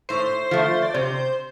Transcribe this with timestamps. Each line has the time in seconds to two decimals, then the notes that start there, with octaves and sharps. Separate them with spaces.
0.09 A2 C5
0.51 F3 A3
0.83 D5
0.94 C3 C5